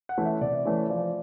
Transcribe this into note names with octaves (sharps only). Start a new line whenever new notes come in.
F#5
E3 A3 C#4 E4
E5
C3 D5
E3 A3 C#4 E4
F3 D5